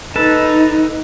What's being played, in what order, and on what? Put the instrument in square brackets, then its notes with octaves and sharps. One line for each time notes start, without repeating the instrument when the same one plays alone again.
[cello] D#4 [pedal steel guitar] A4 B4 A5